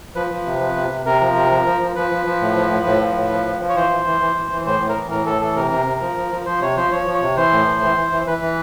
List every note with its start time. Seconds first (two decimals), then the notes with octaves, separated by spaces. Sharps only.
0.15 F3 B4
0.30 F3
0.46 C3
0.60 F3
0.76 C3
0.91 C3
1.06 C3 A#4
1.21 F3
1.35 C3
1.51 F3
1.66 F3
1.81 F3
1.96 F3 B4
2.11 F3
2.26 F3
2.41 A2
2.56 F3
2.71 A2
2.86 A2
3.01 F3
3.16 A2
3.31 F3
3.46 F3
3.61 F3
3.69 C#5
3.76 E3 C5
3.91 E3
4.06 E3
4.21 E3
4.36 E3
4.52 E3
4.66 A2 C5
4.81 A2
4.89 A#4
4.96 E3
5.11 A2 A#4
5.26 A2 A4
5.41 E3 A4
5.56 C3 A#4
5.71 C3
5.86 C3
6.01 F3
6.16 F3
6.32 F3
6.46 F3 C5
6.62 C3 C#5
6.77 F3 C5
6.92 F3 C#5
7.07 F3
7.14 C#5
7.22 C3
7.36 E3 C5
7.52 A2
7.67 E3
7.82 E3
7.97 E3
8.12 E3
8.27 E3 B4
8.42 E3